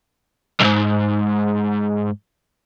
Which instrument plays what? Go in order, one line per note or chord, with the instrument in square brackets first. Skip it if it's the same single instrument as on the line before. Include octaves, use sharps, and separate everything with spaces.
[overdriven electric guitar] B1 G#2